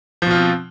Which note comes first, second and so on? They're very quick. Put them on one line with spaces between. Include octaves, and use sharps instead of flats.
F3 B2 F4 C4